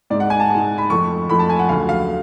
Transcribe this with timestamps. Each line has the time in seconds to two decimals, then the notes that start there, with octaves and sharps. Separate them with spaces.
0.10 G#2 G#3 D5
0.20 F#5
0.30 G#5
0.40 A5
0.50 G#2 G#3
0.78 B5
0.90 F2 F3 A3 C#6
1.29 F2 F3 A3 B5
1.39 A5
1.49 G#5
1.59 F#5
1.69 D2 C#3 F#3 A3 F5
1.89 F5